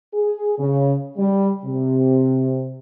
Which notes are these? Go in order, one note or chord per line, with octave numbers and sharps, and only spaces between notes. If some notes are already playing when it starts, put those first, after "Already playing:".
G#4
C#3
G3
C3